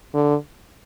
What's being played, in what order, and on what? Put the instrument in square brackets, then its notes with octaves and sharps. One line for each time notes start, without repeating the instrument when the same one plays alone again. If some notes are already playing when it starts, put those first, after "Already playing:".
[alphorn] D3